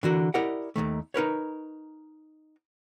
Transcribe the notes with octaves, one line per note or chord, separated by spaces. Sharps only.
D3 E3 F#4 A#4
E4 G4 A#4 D5 D#5 F#5
D#2 A#2 D#3 A3
D#4 A#4 B4 C#5